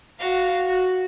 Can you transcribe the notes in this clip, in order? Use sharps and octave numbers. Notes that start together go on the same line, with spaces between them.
F#4 F5
F#4